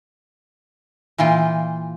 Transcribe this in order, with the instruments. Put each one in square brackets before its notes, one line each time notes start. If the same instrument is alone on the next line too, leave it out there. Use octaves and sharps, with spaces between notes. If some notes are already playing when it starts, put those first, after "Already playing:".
[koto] A#2 E3 F4 G5